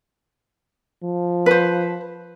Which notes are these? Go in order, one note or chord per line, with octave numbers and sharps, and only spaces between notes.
F3
B4 C5